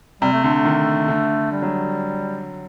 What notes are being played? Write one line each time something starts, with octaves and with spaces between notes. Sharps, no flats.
C3 G3
A3
D3 A3
A3
D#3
D3
G3
F#3